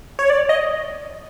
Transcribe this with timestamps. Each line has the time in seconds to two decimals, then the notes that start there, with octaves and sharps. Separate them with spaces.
0.19 C#5
0.30 D5
0.49 D#5